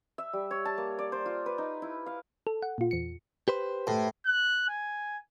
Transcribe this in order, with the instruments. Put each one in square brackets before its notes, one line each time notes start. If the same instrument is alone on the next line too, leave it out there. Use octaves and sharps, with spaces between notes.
[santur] E5
G3
C#5
A5
A#3
D5
C5
F4
B4
D#4
E4
F5
[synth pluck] A4
F#5
A#2 F4
E2 C#7
[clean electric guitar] G4 B4 C5
[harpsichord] A2
[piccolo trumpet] F#6
G#5